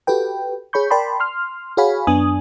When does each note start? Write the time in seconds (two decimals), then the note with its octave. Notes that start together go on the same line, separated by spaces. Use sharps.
0.07 F#4 G4 A4 B4 G5
0.73 G#4 C#5 B5 C#6 G6
0.90 A#4 D5 G5 A5 B5 C6
1.20 C6 F6
1.77 F#4 G#4 C#5 F5 G#5 B5
2.07 F#2 B3 D4 G#5 D#6